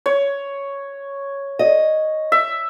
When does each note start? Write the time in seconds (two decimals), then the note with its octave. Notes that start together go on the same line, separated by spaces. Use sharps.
0.06 C#5
1.59 D#5
2.32 E5